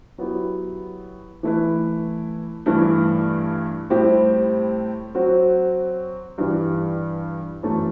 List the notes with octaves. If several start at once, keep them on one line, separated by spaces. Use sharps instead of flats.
F#3 B3 E4 G4
E3 A3 E4 B4
G2 E3 A3 E4
A2 G3 C4 E4 G4
F#3 C4 F#4
G2 E3 G3
F#2 E3 A3